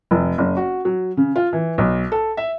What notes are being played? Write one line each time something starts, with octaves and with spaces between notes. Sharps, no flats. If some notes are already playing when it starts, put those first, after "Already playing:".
F1
F#1
F#4
F#3
C#3
F4
E3
B1
A4
E5